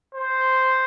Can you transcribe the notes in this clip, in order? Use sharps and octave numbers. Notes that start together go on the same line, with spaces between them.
C5